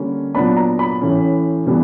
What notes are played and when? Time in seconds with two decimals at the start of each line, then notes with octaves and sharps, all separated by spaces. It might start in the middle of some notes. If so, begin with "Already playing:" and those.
Already playing: D3 G3 A#3 C#4
0.34 A#2 F#3 B3 D4 B5
0.57 A#5
0.79 B5
1.01 A2 E3 A3 C#4
1.67 E3 G3 B3 D4